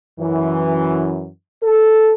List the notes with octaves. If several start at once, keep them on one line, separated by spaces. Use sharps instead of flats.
F#2 E3
A4